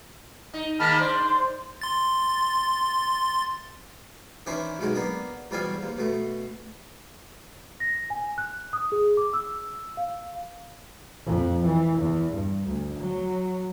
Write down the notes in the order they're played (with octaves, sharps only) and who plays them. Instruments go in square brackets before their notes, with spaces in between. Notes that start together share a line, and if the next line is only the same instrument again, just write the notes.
[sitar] D#4
[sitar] D#3 G#3 A#3 [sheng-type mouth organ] A5 B5 F6
[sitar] D4 [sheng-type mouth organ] C5
[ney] C6
[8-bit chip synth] C6 A6
[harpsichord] D#3 E3 C#4 D4 E4 C5
B1 D#3 G#3 F#4
A#3 B3 D4
E2 B2 F3 G3 F5 G#5
D#2
B2 A3
[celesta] A#6
G#5
F#6
D#6
G#4
D6
E6
F5
[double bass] F2
E3
E2
G2
D2
F#3